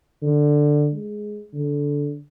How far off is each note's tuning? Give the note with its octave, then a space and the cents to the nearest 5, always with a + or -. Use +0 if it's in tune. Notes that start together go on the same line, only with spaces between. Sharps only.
D3 +10
G#3 +10
D3 -15